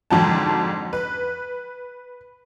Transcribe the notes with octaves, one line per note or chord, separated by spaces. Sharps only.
F2 G#2 D3 F#3 G5 A5
B4